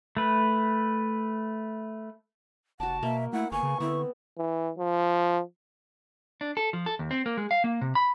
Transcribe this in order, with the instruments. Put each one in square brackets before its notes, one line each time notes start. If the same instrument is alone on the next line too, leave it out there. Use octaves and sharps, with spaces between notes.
[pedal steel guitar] A3 B4
[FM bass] F1 [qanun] F#4 D5 [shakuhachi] F#5 [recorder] A5
[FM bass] B2 [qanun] A#3 [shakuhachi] E5
[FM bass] A3 [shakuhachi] E4 [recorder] F#5
[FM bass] G1 [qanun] A#3 B3 [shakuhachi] G#5 [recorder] C#6
[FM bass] C#3
[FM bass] D3 [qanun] B3 C4 [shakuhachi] E4
[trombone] E3
F3
[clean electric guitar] D4
A4
F3
A4
D#2
C4
A#3
G#3
F5
A#3
C3
B5